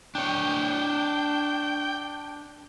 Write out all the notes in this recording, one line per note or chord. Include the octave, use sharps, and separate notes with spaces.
D4 C#5 G5